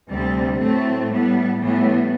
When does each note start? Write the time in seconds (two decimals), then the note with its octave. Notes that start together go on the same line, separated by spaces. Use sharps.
0.09 D2 C3 G3 C4
0.59 A2 F#3 A3 C4
1.09 A2 G3 B3
1.59 A2 E3 G3 B3